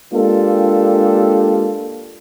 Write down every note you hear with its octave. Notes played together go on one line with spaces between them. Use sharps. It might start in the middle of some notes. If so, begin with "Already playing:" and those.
G#3 A#3 D4 F4 G4 A4